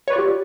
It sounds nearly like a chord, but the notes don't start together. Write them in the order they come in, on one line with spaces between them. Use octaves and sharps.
C#5 B4 D5 F4 G4